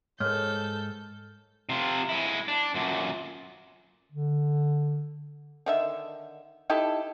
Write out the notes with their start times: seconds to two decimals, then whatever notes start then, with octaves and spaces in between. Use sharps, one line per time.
0.20 G#2 A4 A#4 C#5 F6 G6
1.69 C3 F4
2.09 G#3 E4
2.48 D4
2.74 F#2 A#2
4.12 D3
5.66 D3 D#3 E5
6.70 D#4 E4 G4 A4